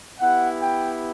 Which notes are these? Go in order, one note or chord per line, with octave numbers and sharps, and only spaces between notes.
B3 E4 G4 F#5
G5